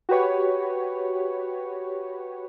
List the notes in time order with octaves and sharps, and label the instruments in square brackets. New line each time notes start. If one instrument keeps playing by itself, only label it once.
[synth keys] F#4 G4 B4 C#5